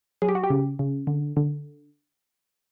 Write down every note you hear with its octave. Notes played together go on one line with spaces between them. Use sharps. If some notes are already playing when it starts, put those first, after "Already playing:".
F#3 G#4
G4
F#4
G4
C#3
C#3
D3
D3